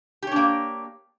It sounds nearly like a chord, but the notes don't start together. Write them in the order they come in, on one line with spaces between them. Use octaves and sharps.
G4 C#5 D4 A#3